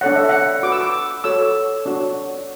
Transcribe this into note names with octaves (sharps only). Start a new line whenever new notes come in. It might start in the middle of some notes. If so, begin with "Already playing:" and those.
D4 A4 C#5 F#5
E5
F#5
F#4 B4 D6
E6
D6
F#4 A4 C#5 E6
D4 F#4 C#5